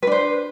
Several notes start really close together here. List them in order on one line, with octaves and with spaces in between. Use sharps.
B4 D4 C5